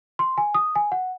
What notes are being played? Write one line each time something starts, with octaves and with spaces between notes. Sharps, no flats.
C6
G#5
D#6
G#5
F#5